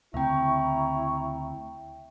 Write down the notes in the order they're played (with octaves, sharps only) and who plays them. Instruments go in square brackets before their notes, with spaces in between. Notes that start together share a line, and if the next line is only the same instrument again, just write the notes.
[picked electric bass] D2 C#3 C4 [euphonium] E4 [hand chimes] E5 G5 [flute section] A#5 C#6